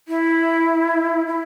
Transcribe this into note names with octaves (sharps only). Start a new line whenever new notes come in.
E4
E4